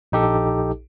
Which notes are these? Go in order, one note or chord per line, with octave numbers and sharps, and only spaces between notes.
A#1 D#4 G4 A4